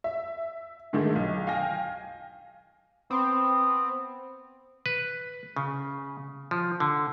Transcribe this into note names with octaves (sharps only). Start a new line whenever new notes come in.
E5
G#2 D3 D#3 A3 G#4
B1
F5 G5 G#5 A#6
B3 C4
B4
C#3
F3
D3